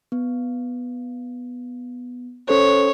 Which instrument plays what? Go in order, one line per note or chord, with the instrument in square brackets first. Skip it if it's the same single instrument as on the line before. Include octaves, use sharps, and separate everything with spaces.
[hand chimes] B3
[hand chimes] C#4 A4 C5 [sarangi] C#5